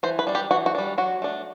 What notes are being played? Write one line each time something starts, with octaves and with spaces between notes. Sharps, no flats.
E3 C5
B4
G3 D4
G4
E3 F#4
F#4
G3 D4
F#3 F#4
A3 D4